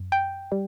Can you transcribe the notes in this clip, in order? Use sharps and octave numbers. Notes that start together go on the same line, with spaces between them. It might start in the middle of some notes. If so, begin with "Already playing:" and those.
Already playing: F#2
G5
G3